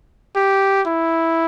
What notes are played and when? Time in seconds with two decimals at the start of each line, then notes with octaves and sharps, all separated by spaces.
0.36 G4
0.87 E4